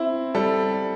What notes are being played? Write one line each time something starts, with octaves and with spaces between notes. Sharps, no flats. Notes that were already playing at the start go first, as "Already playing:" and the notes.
Already playing: C4 E4
G3 A4